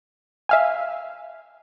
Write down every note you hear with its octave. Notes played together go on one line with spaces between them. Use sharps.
E5 F5 G#5